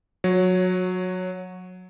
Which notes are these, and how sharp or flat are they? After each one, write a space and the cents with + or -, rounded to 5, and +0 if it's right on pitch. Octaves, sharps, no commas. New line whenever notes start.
F#3 -20 C#5 +0